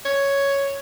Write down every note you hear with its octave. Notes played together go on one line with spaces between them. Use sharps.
C#5